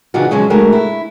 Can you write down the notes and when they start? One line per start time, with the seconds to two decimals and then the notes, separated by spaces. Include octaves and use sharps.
0.14 C#3 E3 D4 D#4 F4 F#4
0.31 C#3 F3 F#3 G#3 C#4
0.50 D3 G#3 A3 F#4 A#4
0.73 E4